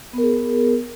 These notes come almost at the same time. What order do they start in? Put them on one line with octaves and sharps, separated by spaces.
B3 A#4 G#4